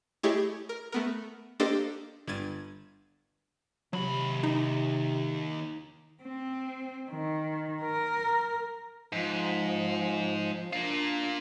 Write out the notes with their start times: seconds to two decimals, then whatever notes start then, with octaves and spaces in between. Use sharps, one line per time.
0.23 A3 E4 G4 G#4 C#5 D#5
0.69 A#4
0.92 A3 B3 A#4
1.60 A#3 D4 G4 A4 C5 D#5
2.27 G1 G2 G#6 A6 D#7
3.93 D#2 C3 F#3 B5
4.43 D#4
6.23 C4
7.11 D#3
7.83 A#4
9.12 G#2 F3
10.73 A#3 D4 F4